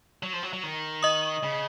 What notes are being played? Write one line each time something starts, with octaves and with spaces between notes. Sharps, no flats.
F#3
F3
F#3
F#3
D#3
D#5 D#6
C#3